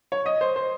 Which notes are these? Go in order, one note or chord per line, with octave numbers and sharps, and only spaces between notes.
C#5
D#5
C5
C5